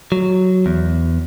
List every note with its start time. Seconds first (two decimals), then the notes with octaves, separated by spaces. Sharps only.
0.12 F#3
0.66 E2